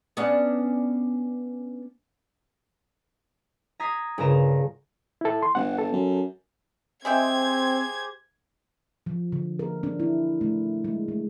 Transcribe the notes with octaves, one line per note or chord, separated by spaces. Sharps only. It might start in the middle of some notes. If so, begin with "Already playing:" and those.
B3 C#4 D4
A#5 D#6 G#6 B6 C7
G1 C#3 F4 A#4 A#5 E7
E4 A4
C6
G1 F#5
A4
F#2
G#3 C4 G4 G#4 C5 E5 G5 G#6
F3
D3
A#4
D4
E4
A3
G#3
A3